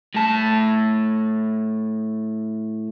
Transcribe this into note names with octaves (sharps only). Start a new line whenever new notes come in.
A2 A5